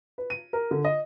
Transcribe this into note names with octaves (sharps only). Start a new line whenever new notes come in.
B4
D#7
A#4
D3
D#5